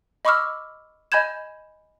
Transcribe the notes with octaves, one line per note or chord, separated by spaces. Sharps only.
D#5 B5 C#6 D6 E6 F6
D#5 G#5 B5 G6 G#6 E7